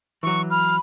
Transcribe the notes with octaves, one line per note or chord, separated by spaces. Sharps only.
E3 F#3 C#6
B5 F6